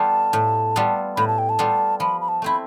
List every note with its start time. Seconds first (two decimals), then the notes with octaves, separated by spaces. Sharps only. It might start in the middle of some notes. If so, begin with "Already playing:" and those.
Already playing: G3 B3 F4 A4 A5
0.33 A2
0.76 G3 B3 F4 A4
1.17 A2 B5
1.27 A5
1.39 G5
1.49 A5
1.59 G3 B3 F4 A4
2.00 F3 B5
2.21 B5
2.28 A5
2.42 A3 C4 E4 B5